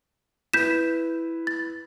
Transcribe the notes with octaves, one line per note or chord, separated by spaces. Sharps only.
E4 B4 G6 B6 E7
A6